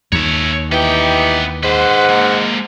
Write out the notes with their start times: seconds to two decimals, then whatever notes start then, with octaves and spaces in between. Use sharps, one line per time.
0.12 D#2 C#5 E5
0.72 E3 B3 D#4 G4 G5
1.63 G#2 B4 C5 F#5
2.09 G#3 A#3